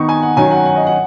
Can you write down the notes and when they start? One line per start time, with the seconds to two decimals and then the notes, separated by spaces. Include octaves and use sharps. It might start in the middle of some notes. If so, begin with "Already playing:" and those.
Already playing: D#3 B3 D#4 C#6
0.09 G#5
0.22 F#5
0.37 D#3 F#3 C#4 G#5
0.51 F#5
0.65 F#5
0.76 D#5
0.87 F#5